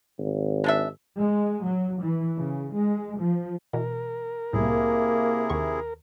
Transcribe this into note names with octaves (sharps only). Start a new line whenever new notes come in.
G#1
G#3 D4 E5
G#3
F#3
E3
C#3
G#3
F3
B2 E3 A#4
C2 A2 C3 A#3 E4 G#4
D#2 D#3 C#6